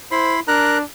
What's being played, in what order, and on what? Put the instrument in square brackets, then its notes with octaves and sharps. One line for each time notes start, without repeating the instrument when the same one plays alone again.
[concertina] E4 B5 C6 [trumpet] C5
[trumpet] D4 [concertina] A#4 A#5 F#6